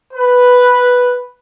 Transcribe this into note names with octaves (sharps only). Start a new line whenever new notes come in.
B4